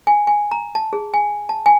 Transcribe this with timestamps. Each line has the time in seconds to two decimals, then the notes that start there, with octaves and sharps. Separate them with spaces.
0.07 G#5
0.27 G#5
0.51 A#5
0.75 A5
0.93 G#4
1.14 G#5
1.49 A5
1.66 G#5